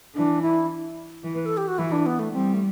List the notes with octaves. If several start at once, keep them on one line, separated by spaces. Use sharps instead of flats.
E3 D4
E4
E3
B4
A4
G4
F#4
E3 E4
D4
B3
A3
G3 C4
A3